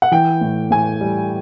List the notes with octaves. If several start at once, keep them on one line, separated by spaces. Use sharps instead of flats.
F#5
E3 G5
A2
A2 G#5
G3